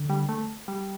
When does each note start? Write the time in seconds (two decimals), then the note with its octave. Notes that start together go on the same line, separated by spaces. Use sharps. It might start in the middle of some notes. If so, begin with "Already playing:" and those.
Already playing: D3
0.10 G3
0.29 A3
0.68 G3